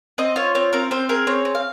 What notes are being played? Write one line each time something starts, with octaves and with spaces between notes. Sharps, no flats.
C4 D#5
F4 C#5
C4 C#5
C4 A#4
C4 C5
G#4 A#4
C4 C#5
C4
F5